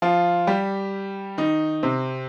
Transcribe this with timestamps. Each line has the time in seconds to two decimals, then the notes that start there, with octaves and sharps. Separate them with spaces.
0.02 F3 F4
0.47 G3 G4
1.38 D#3 D#4
1.83 C3 C4